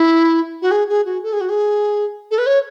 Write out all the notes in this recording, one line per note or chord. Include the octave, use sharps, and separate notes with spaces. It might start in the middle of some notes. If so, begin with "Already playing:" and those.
Already playing: E4
F#4
G#4
G#4
F#4
A4
G#4
F#4
G#4
A4
B4
C#5